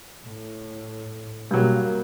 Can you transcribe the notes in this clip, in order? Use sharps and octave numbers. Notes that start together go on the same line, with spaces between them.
A2
G2 B2 F#3 A#3